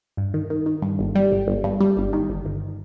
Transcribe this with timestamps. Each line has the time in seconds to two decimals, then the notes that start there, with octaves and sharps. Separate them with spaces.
0.17 G2
0.34 D#3
0.50 D#3
0.66 D#3
0.82 G2
0.99 G1
1.15 G3
1.32 G1
1.48 G1
1.64 G2
1.80 G3
1.97 G1
2.13 D#3
2.29 G1
2.46 G1